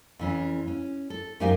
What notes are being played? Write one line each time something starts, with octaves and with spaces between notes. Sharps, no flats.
F2 E3 C#4
C#4
A4
F#2 D#4 G4 C5 F5 G#5